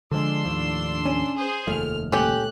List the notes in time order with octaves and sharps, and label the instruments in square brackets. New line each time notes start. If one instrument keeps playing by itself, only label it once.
[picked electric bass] D3 F3 G#3 [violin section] D4 C6 E6
[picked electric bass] D#2 A2 F3
[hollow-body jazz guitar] C#4
[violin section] G#4 C5
[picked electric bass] F1 D#2 [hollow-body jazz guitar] F3 A3 [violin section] F6
[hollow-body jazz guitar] C#2 A#2 A3 [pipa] C#4 G4 [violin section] F#6